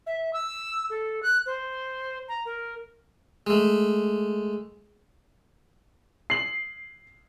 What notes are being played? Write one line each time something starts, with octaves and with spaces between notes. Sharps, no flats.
E5
E6
A4
F#6
C5
A#5
A#4
G#3 A3
C7 F#7